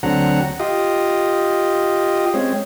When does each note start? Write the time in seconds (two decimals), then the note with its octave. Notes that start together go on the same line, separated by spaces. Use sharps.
0.03 D2 D3 F#3 C4 F#5 A#5
0.60 F4 G4 D#5
2.34 G#3 C4 C#4